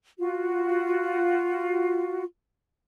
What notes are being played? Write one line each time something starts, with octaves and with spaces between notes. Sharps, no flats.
F4 F#4